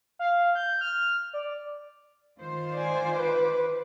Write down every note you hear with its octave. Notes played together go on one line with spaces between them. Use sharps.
F5
G6
F6
D5
D#3 F4 C5
D5 G#5
B4 D6